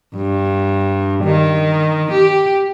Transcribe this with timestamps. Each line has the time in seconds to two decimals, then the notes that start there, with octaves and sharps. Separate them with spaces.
0.16 G2
1.24 D#3
2.12 G4